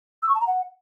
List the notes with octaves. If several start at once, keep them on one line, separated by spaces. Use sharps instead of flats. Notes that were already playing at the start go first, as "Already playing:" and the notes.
E6
C#6
A5
A#5
F#5